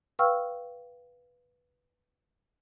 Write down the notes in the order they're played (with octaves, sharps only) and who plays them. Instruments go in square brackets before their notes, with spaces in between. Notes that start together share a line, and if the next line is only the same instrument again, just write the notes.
[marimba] B4 F5 G5 C#6 E6 F6